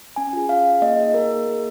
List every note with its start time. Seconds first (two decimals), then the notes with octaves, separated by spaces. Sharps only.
0.16 C#4 G#5
0.33 F4 G#4
0.49 C#4 F5
0.65 F4 G#4
0.82 A#3 D#5
0.98 D#4 G#4
1.14 A#3 A#4
1.31 D#4 G#4
1.46 A#3